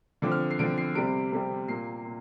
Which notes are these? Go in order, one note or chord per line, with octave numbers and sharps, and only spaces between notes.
D3 F3 C4 D6
F6
C7
D3 F3 C4 D7
C7
C3 G3 C4 D7
C3 G3 C4
A#2 A#3 C7
A#2